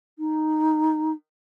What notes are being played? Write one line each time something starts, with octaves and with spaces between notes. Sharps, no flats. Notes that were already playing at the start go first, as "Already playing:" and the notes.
D#4